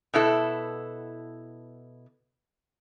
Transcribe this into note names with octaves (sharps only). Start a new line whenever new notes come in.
B2 B3 E4 A4